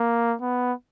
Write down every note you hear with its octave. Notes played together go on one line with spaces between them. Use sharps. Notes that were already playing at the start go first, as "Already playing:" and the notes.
Already playing: A#3
B3